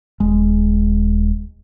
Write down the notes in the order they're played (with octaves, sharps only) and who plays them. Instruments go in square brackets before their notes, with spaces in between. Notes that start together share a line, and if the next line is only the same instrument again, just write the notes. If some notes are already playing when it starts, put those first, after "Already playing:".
[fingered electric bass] D#1 G#3